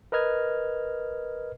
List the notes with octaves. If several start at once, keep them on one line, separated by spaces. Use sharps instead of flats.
A#4 B4 D#5 F6 G#6